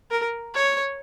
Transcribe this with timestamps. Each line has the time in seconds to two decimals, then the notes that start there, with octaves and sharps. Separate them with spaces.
0.11 A#4
0.54 C#5